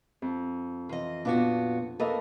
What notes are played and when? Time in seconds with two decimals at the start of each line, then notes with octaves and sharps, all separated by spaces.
0.22 F2
0.89 E3 F4 D#5
1.25 A#2 B3 D4 F#4 D6
2.00 A#3 A4 B4 D#5